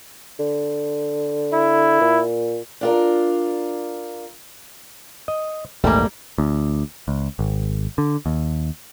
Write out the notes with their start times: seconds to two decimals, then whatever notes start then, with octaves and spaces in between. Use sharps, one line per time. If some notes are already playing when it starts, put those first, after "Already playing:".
0.39 D3
1.53 E4
2.01 A#2
2.81 D4 F4 A#4
5.28 D#5
5.84 A#1 E2 G#2 G3 A3 A#3
6.38 D2
7.08 C#2
7.39 G#1
7.98 D3
8.26 D#2